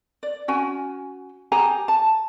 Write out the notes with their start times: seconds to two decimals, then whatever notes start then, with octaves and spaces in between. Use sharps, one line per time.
0.23 D5
0.48 C#4 F#4 G#5
1.52 G4 G#4 G#5 A#5
1.88 A5